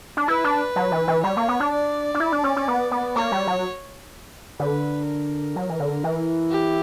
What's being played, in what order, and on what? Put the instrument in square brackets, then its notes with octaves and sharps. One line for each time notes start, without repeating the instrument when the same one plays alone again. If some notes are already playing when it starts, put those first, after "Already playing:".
[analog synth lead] D4
[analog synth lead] E4 [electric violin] B4
[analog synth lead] D4
F#3
E3
E3
[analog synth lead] G3 [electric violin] C#5
[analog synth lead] A#3
B3
D4
[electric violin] D5
[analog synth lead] D4
E4
D4
C#4
C#4
B3
B3
[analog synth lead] A#3 [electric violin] C#5
[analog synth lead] G3
F#3
[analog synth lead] D3 [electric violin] B4
[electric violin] A#4
[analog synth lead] F#3
E3
D3
E3
[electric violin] G4